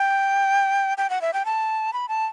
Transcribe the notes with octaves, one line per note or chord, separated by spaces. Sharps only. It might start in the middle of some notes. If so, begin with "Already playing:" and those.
Already playing: G5
G5
F#5
E5
G5
A5
B5
A5